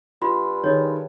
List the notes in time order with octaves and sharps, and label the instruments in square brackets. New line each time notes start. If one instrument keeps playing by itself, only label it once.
[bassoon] G2 [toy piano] F4 [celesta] B5 C6
[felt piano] D#3 G#4 [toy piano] C#5 D#5